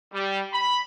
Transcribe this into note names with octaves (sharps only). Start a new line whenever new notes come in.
G3
B5